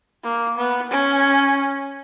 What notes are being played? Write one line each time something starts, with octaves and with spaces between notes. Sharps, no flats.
A#3
B3
C#4